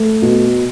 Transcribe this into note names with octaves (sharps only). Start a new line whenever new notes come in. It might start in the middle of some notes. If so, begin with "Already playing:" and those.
Already playing: A3
B2